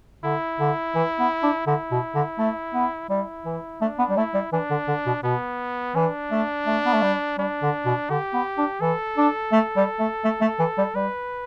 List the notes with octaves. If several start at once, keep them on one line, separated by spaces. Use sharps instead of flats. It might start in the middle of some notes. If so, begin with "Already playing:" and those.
D3 E4
D3
E3
B3
D4
D3 E4
B2
D3
A3
B3
G3 E4
E3
A3 D4
B3
G3
A3 E4
G3
E3 D4
D3
D3
B2
B2 B3
E3 D4
A3
A3
B3
A3
G3
G3 D4
D3
B2
D3 G4
B3
D4
E3 A4
D4
A3
G3
A3
A3
A3
E3
G3
G3 B4